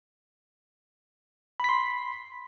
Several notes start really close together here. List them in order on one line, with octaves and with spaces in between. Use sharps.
B5 B6 C6